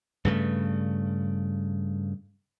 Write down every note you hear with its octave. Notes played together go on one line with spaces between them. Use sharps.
G2 C#3 A3